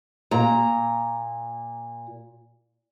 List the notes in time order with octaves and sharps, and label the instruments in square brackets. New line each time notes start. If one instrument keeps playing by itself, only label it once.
[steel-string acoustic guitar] A#2 [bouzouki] A#5